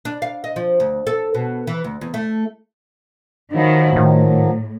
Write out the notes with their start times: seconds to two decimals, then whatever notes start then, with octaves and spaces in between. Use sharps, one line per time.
0.05 D4
0.22 F5
0.44 D#5
0.56 F3
0.80 D2
1.07 A4
1.34 B2
1.67 E3
1.84 D2
2.01 E2
2.14 A3
3.53 D#3 F3 F#3 E4
3.96 A2 D#3